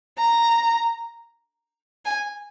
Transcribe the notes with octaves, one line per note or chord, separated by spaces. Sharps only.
A#5
G#5